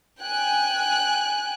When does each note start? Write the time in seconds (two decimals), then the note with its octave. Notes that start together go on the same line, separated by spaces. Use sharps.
0.21 G5 G#5 F#6